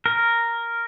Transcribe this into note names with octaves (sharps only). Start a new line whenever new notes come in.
A#4